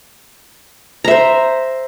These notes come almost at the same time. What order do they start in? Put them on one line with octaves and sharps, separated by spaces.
A#5 E5 C5